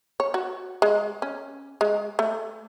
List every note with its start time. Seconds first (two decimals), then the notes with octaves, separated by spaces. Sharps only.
0.20 C#5
0.34 F#4
0.82 G#3
1.22 C#4
1.81 G#3
2.19 A3